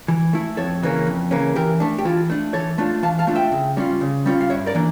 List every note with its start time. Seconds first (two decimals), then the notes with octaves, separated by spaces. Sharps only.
0.08 E3
0.33 A3 E4
0.57 F2 A4 C#5
0.82 C#3 E3 A#3 C#4
1.07 F2
1.31 C#3 E3 A#3 C#4
1.55 E3 G4 A#4
1.80 A3 D4
1.98 G4
2.05 E3 F4 A4
2.30 A3 D4
2.53 E3 A4 C#5
2.78 A3 D4 F4
3.03 E3 F5 A5
3.19 F5 A5
3.27 A3 D4 F4
3.35 E5 G5
3.52 C#3
3.77 G3 C#4 F4
4.01 C#3
4.26 G3 C#4 F4
4.41 F5
4.50 G2 C#5 E5
4.66 A#4 D5
4.75 E3 A#3 D4